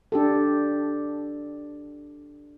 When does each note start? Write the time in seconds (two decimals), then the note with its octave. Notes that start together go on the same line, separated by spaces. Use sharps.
0.12 D4 G4 A4